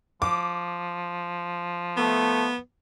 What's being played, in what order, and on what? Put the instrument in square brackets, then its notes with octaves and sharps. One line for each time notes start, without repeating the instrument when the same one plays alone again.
[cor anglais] F3 [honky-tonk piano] D6
[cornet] A3 [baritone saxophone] B3